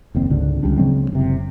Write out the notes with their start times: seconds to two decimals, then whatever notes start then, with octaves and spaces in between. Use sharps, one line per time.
0.15 F1 D#2 C4
0.30 C#2 G#2 D3
0.63 C#2 G3 D4
0.78 C#3 F#3 G#3 C4
1.11 F#1 C3